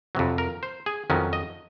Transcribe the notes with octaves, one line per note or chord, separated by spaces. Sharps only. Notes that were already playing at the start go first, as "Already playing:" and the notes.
F2 C3 F#3
A#4
C5
G#4
F2 D#3 F#3 C#4
D#5